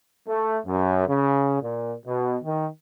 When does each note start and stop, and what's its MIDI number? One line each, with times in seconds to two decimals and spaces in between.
0.28 0.58 57
0.66 1.07 42
1.08 1.58 49
1.62 1.95 46
2.05 2.37 47
2.43 2.67 51